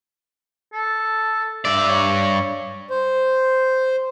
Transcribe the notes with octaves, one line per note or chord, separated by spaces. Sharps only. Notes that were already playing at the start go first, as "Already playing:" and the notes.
A4
G2 D5 E5
C#5
C5